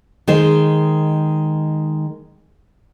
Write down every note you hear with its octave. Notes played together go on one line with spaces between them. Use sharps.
D#3 G#3 C5